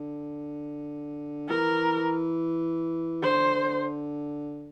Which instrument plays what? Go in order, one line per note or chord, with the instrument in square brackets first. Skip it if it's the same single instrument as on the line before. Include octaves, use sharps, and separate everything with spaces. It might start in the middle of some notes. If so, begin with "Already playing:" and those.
Already playing: [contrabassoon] D3
[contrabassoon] E3 [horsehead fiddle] A#4
[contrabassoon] D3 [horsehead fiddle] C5